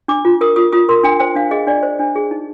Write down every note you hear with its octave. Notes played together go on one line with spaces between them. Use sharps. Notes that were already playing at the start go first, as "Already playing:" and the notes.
D4 D6
F4
A#4 D#6
F4 D#6
F4 D#6
A#4 C6
D4 G5
C5 G5
D4 F5
G#4 D#5
D4 D5
C5
D4
G#4
D#4